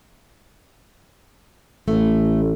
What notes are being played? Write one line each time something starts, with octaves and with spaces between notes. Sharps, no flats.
A1 A3